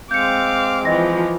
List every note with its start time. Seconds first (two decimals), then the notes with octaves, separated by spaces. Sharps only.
0.11 G#3 C4 F5 D6 G6 C#7
0.85 E3 F3 D#5 A#6